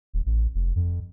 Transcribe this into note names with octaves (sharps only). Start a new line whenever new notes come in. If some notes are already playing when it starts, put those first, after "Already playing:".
D#1
A1
F1
F2